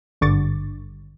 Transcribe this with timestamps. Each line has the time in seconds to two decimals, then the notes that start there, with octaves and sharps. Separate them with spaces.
0.21 G#1 G2 D3 C#6 D6 A6